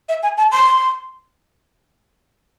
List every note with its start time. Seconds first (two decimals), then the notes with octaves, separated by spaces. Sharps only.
0.09 E5
0.23 G#5
0.38 A5
0.52 C6